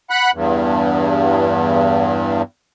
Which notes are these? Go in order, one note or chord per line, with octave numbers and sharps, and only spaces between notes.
F#5 B5 F#6
E2 G2